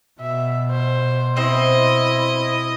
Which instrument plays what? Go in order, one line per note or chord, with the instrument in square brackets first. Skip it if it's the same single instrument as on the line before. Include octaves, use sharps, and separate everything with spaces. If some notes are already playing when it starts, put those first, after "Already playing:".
[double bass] B2 [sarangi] E5
[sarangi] C5
[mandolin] C4 C5 [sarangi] E4 [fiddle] D#5